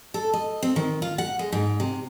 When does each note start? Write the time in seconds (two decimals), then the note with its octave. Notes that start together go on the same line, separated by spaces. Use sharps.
0.14 A4
0.33 D#5
0.63 C4
0.76 D#3
1.02 F4
1.18 F#5
1.39 G#3
1.52 G#2
1.80 C3